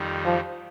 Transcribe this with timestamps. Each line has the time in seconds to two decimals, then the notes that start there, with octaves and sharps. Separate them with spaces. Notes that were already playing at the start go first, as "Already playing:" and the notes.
Already playing: F2 D#3 G3
0.25 F3